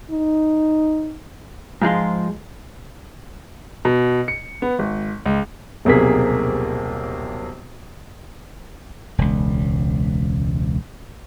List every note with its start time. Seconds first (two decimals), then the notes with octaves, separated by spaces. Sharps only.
0.11 D#4
1.82 G#2 F3 G#3 F4
3.85 B2
4.28 C#7
4.62 B3
4.79 G#1
5.26 C#2
5.85 D#1 B1 C3 A#3 G#4 B6
9.18 E1 C#2